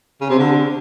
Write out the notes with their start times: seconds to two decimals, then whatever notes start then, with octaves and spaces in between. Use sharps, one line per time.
0.21 C#3
0.30 C3
0.39 D3